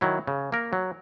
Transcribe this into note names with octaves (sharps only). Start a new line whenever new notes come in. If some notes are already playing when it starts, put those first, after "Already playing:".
D#3 F#3 E4
C#3
A#3 A#4
F#3